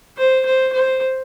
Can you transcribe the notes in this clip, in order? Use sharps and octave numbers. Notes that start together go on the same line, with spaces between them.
C5
C5
C5